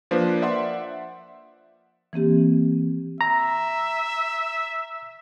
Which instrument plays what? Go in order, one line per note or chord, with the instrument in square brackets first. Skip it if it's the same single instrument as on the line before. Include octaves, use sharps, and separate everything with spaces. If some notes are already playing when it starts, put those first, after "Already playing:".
[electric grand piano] F3 A#3 D4 B4 C5
D5 E5 F#5 C6
[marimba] E3 A#3 C4 G4
[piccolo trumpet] E5 [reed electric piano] A#5